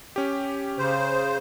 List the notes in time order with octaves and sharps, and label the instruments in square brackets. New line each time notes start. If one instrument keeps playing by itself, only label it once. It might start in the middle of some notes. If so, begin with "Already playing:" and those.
[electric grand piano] C#4 G4
[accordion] C#3 C5